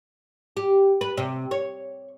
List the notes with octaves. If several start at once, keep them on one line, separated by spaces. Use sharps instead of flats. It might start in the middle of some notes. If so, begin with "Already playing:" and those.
G4
B4
C3
C#5